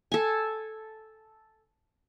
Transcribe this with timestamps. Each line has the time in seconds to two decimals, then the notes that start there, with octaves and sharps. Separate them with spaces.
0.12 A4 G#5